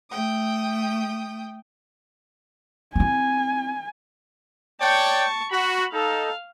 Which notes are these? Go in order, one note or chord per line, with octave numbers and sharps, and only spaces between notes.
A3 G5 D#6
C4 E4 G#5
C#5 D5 G5 A5 C#6
F#4 B5
D#4 A4 F5